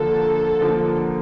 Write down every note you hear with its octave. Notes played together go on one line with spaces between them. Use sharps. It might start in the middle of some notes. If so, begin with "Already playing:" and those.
Already playing: D3 F3 A#3 A4
D3 F3 A#3